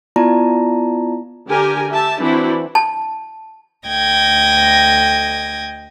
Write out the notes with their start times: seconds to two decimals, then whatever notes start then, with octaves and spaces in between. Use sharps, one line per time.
0.16 B3 E4 F4 D5 A5 A#5
1.49 D3 G4 A#4 G#5
1.90 G4 E5 A5
2.19 E3 C4 D4 E4 F#4
2.75 A5
3.87 D2 D#5 G5 G#6 A#6